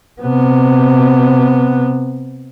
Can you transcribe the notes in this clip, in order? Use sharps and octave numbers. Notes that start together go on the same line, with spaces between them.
C3 B3